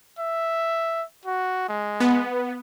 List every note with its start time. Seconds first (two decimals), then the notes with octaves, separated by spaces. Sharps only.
0.19 E5
1.26 F#4
1.69 G#3
2.00 B3